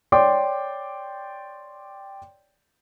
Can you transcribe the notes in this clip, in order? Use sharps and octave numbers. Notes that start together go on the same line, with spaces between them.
C#5 D5 G5 C6 D6